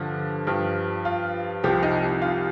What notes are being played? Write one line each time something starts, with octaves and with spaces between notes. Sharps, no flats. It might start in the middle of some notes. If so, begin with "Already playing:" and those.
Already playing: G2 D3 F3
G2 F3
F4
C2 C3 F3 G4
D#4
F4